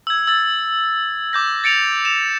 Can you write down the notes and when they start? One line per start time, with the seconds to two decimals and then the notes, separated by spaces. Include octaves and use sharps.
0.07 E6 G#6
0.27 E6 A6
1.33 D6 G6 A#6
1.64 A6 C#7 D7 F7
2.05 E7 F7